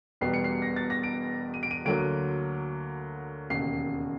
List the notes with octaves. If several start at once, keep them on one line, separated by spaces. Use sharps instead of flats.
E1 E2 B2 G3 B3 C7
C#7
C7
A#6
A6
A#6
D7
D#7
D7
D#7
D2 D3 F#3 A#3 D7
E1 D#2 C#3 C7